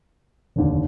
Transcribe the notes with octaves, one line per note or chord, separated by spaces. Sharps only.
F1 D#2 D3